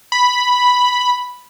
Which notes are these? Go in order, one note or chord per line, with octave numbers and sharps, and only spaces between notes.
B5